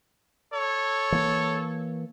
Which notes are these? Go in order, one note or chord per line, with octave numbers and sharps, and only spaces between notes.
A4 C#5
E3 A#3